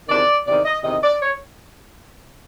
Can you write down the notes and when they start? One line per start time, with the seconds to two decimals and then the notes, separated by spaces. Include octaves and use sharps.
0.08 E2 C3 D#3 D5
0.46 E2 C3 D#3 D5
0.65 D#5
0.84 E2 C3 D#3 D#5
1.03 D5
1.22 C#5